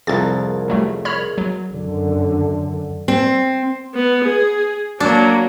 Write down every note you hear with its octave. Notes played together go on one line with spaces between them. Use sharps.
C2 F2 G#4 A#4 A6
F#3 G3 A3
C#5 B5 F6
F#3
F#2 D3
C4
B3
G#4
F#3 A#3 D4